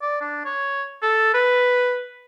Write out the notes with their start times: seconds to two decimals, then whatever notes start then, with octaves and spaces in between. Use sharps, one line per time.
0.02 D5
0.21 D4
0.45 C#5
1.02 A4
1.34 B4